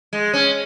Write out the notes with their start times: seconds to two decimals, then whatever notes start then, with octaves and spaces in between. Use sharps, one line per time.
0.13 G#3
0.33 C#4